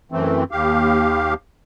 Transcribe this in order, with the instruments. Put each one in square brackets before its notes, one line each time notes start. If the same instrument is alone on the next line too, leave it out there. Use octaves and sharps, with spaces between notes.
[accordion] F#2 E3 A3 C4
D#2 G4 F5